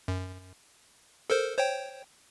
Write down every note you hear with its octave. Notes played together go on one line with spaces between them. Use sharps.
F#2
A4 A#4 C5
C5 C#5 G5